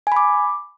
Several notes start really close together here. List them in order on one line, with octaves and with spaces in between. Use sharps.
G#5 B5 D6